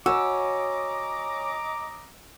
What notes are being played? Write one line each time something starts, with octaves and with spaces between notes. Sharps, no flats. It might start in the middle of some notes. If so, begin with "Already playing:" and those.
C#4 F#4 C#5 D#5 A#5 D6 E6